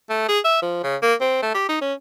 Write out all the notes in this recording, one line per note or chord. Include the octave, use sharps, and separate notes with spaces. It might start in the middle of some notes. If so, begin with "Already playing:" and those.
A3
G#4
E5
F3
C#3
A#3
C4
A3
G4
D#4
C#4